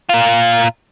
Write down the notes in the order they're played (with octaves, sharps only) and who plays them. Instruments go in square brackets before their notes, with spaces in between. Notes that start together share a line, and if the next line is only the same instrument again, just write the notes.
[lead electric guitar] A#2 F4